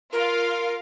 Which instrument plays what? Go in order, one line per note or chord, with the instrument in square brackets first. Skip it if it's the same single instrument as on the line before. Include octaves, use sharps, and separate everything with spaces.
[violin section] F4 F5 [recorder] A#4